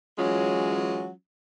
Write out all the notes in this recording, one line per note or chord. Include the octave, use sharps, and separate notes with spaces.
E3 F#3 G#3 C#4 F4